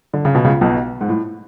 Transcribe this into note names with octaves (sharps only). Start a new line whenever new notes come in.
D3
C#3
B2
C#2 C#3
B1 B2
G#2
A2